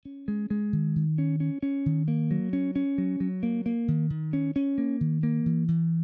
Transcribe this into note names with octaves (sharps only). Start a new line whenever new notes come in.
C#4
G#3
G#3
D#3
D#3
C#4
C#4
C#4
D#3
A#3
F#3
C#4
C#4
F#3
F#3
A#3
A#3
D#3
D#3
C#4
C#4
A#3
D#3
A#3
E3
E3